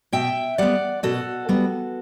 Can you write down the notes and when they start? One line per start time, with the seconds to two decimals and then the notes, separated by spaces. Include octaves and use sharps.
0.13 B2 E5 G5
0.58 G3 B3 D5 F#5
1.03 B2 F#4 A4
1.49 G3 B3